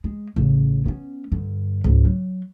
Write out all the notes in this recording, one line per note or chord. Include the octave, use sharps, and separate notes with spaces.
G#3
A1 C#3
B3 C#4
G2 D3
C#2 G#2
F#3